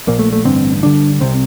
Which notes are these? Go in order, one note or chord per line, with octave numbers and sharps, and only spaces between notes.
A#1 A#2 A#3
A3
A3
A1 G2 D3 C4
G1 G2 D3 D4
C2 C3 C4